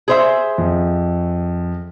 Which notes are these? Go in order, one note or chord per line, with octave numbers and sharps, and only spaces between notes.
G#4 C5 E5
F2